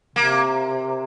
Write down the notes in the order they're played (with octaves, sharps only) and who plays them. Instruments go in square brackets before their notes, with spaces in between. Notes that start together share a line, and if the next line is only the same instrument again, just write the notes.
[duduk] C3 [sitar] A#3